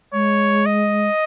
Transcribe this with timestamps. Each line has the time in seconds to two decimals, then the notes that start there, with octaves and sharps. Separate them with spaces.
0.13 G#3 C#5
0.66 D#5